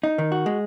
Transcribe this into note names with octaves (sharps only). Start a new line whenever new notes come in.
D#4
D#3
F#4
G#3